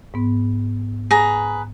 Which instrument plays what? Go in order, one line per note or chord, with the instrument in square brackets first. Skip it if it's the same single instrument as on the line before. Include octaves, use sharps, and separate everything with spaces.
[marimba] G#2 B3
[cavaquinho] G#4 B4 A#5